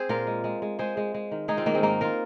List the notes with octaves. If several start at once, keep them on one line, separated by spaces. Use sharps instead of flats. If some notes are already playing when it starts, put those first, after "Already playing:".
Already playing: C4 G#4 C5
A#2 F4 A#4
G#3
G#3
G#3
G#3 G#4 C5
G#3
G#3
D#3
G#3 D#4 G#4
C4 F4
D#3 A#3 D#4
G#3 C4
G#2 A#3 D#4
F4 A#4